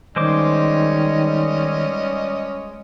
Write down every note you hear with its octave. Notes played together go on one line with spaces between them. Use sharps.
D#3 G3 G#3 C#4 C5 D#5 D6